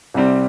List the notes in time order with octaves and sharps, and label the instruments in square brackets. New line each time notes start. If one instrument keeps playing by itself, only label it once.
[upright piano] C2 C3 G3 C4